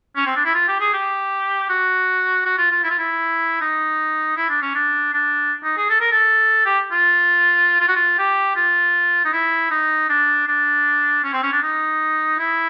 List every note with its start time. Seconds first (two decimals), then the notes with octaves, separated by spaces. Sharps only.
0.17 C#4
0.26 C4
0.36 D4
0.45 E4
0.54 F4
0.68 G4
0.80 G#4
0.93 G4
1.69 F#4
2.46 F#4
2.58 F4
2.71 F4
2.83 E4
2.90 F4
2.99 E4
3.61 D#4
4.37 E4
4.49 D4
4.62 C#4
4.75 D4
5.13 D4
5.64 D#4
5.77 G#4
5.89 A4
6.01 A#4
6.11 A4
6.65 G4
6.91 F4
7.80 F4
7.88 F#4
7.96 F4
8.18 G4
8.56 F4
9.25 D#4
9.33 E4
9.71 D#4
10.09 D4
10.48 D4
11.24 C#4
11.33 C4
11.43 C#4
11.52 D4
11.62 D#4
12.39 E4